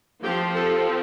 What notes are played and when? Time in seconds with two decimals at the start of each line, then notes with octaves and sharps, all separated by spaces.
0.23 F3 C4 G4
0.55 A4